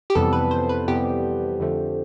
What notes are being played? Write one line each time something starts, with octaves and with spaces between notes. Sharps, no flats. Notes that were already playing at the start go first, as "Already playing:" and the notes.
G4
F2 C3 E3 G3 B3 A4
B4
C5
B4
F2 C3 E3 G3 B3 G4
F2 D3 F3 A3